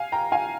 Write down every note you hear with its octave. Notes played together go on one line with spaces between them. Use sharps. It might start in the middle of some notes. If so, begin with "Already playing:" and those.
Already playing: F5 G#5
G5 A#5
F5 G#5